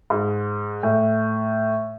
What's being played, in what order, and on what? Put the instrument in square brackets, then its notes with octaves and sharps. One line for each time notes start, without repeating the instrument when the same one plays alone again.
[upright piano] G#2
A2